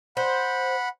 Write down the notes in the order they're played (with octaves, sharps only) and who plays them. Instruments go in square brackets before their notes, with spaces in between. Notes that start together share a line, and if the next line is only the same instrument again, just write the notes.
[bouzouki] C5 [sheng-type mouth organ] F#5 B5